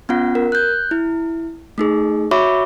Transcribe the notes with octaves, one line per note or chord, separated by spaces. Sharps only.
B3 C#4 F4 F#5
A#4
F#6 G6
E4
A3 D#4 G#4
F#4 C#5 E5 B5 C#6 D6